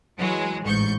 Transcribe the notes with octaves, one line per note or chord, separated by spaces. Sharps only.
E3 F#3 G#3
A1 G#2 C#6 G6